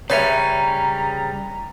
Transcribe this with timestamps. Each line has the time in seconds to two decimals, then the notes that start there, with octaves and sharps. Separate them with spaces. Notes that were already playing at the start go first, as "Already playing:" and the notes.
0.10 C#3 G3 C#4 B4 C#5 E5 G#5 A#5